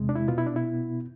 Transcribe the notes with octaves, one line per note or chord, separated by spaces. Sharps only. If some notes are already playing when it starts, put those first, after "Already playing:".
Already playing: E2 C3 G#3
D4
E4
B2 B3 F4
E4
D4
E4